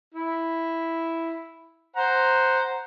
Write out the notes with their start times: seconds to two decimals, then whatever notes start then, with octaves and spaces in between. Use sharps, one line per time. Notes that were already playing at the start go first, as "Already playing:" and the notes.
0.14 E4
1.96 C5 F#5 A#5